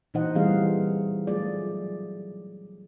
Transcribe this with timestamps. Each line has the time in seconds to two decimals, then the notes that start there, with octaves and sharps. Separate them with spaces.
0.14 A#2 E3 D#4 C5 D#5 F#5
0.35 E3 G3 A3 C4 G#4 F5
1.27 F#3 A3 F4 G#4 D5